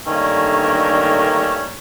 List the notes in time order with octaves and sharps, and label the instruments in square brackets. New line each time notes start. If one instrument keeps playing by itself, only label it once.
[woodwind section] G2 D3 D#3 A3 A#3 C#4